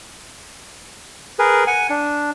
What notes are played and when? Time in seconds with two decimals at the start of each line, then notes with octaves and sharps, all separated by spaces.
1.39 G#4 A#4 B4
1.67 F#5 G#5
1.90 D4